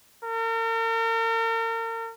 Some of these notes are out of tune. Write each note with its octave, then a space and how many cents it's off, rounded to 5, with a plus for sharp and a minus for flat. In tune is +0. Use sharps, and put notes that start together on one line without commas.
A#4 -40